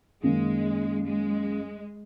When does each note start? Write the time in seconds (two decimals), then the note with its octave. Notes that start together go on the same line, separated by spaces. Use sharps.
0.23 F#2 D#3 G#3 A#3
1.06 G#3